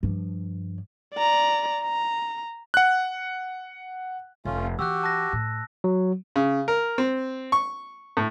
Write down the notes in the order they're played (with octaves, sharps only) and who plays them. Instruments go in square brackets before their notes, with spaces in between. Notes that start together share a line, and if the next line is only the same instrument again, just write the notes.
[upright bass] G2 F3
[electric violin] D5 A#5
A#5
[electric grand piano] F#5 F#6
[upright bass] F1 [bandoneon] A3 C#4 F4
[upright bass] E3 [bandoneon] F#4 G4 [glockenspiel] E6 F#6
[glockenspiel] A5 F#6 A#6
[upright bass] A2
[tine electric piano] F#3
[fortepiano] C#3
A#4
C4
C#6
A2